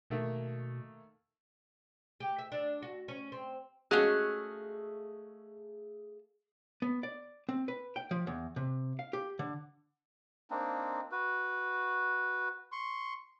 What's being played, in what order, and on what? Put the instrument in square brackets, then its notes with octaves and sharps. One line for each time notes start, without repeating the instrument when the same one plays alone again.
[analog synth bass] B2 [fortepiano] D#3 A3 A#3
[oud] G4
E5
D4
F#4
C#4
C4
[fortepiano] G#3 C#4 F#4 [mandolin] A3 F5 F#6 [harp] G#4
[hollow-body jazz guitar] B3
D5
C4
B4
G5
F3
E2
C3
F5
G4
D3
[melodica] A#3 C4 D4 D#4
F#4 B4
C6 C#6